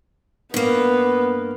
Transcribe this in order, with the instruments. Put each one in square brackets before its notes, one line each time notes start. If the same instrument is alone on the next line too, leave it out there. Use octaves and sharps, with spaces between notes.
[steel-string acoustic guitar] G2 A#3 [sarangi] B3